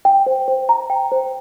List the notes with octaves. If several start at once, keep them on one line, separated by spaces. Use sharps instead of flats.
G5
C5
C5
A#5
G5
C5